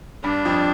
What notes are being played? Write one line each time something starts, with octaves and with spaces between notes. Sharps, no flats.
G2 G3 D4
F2 F3